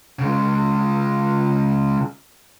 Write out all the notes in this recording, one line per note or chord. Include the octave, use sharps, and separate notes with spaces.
C#3 G#3